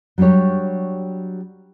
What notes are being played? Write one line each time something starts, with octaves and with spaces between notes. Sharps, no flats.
F#3 G3 D4 G4 C#5